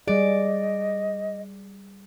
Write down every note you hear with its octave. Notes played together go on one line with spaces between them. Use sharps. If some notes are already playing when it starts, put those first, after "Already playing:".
G3 G#4 D5 D#5